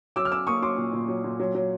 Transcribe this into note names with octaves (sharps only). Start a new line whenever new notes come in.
F#3 D6 E6
F6
C#4 D6 E6
A#3 C#6 D#6
F#3 C6 D6
A#2
A#2
F#3
A#2
F#3
F#3